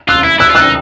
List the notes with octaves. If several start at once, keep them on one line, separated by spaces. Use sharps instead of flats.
F4 E6 F#6
E4
E4 E6 F#6
F4
E6 F#6
D#4